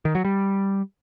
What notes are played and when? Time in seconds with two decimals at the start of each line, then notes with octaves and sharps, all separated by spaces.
0.05 D#3
0.15 F#3
0.25 G3